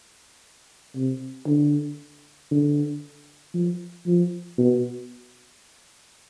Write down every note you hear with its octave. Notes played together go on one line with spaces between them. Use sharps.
C3
D3
D3
F3
F3
B2